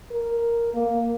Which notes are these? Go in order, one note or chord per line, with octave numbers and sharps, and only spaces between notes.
A#4
A#3